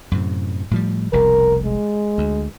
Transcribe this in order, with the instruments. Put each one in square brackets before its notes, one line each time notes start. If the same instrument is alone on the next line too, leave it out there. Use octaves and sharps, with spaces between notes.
[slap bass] F#2 A2 C3
A2 F3 G3
[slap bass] F1 C2 B2 [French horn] A#4
[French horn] G#3
[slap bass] D2